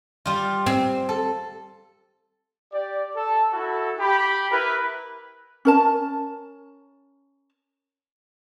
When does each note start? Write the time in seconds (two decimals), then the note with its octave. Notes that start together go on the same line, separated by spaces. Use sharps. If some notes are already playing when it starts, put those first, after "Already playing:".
0.25 G3 F4
0.66 C4
1.09 A4
2.73 G4 D5
3.16 A4
3.53 E4 F#4 A4
3.99 G4 B5
4.52 E4 A#4 B4
5.65 C#4 A#4 A5